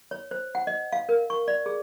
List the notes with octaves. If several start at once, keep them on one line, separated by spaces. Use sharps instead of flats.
C#5
C5
F#5
D#5
F5
A#4
C#6
D5
G#4